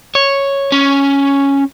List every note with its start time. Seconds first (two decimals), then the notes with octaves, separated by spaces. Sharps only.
0.15 C#5
0.72 C#4